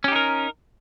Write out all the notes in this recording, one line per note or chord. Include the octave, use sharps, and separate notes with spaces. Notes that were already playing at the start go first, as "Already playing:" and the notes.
C#4 D#4 G4 A#4